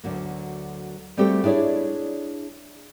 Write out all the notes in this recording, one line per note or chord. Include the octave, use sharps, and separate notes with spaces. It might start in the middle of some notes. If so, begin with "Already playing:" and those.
D2 D3 F#3 A#3
G3 A3 C4 F#4 G4 A4
D4 E4 G#4 C#5 D5